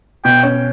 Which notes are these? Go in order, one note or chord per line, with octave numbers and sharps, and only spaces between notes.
B2 G5
C#4